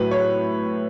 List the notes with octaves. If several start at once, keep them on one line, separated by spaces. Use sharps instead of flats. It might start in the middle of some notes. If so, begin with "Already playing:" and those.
Already playing: A2 F#3 B4
C#5